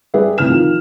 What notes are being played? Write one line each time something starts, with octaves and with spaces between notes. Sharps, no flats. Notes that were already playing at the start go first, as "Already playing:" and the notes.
G3 G#4 B4 E5
A2 C3 F6 E7
D#3 F3